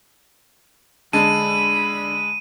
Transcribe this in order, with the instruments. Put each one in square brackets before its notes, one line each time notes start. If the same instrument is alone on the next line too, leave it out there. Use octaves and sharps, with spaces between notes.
[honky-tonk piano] D3 [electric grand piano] G#3 A5 [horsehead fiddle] B5 [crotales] D#7